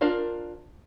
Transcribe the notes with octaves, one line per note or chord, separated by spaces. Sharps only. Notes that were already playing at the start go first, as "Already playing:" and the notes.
D4 F4 A#4 C5 D5